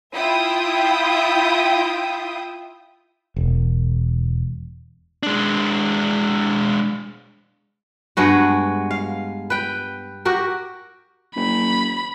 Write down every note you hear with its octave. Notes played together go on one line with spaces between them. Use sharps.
E4 F4 E5 G5 D#6
E1
G#3 D4
G2 G#3 B3 F#4
F5
B4 G5
F#4 G4 A#4
F#1 B5